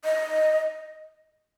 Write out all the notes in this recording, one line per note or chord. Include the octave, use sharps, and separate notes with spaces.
D#5